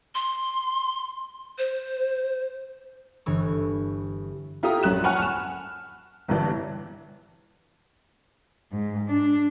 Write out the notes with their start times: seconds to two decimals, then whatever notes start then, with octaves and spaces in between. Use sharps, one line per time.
0.15 C6
1.58 C5
3.26 G1 G2 E3 C#6 E6
4.63 E4 F4 G4 A4 A#5 D#6
4.83 A#1 F#2 C#4 F#6 E7
5.04 F#5 G#5 A5 B5 C#6 F6
5.19 F6 E7
6.28 G1 G2 E3
8.72 G#2
9.09 D4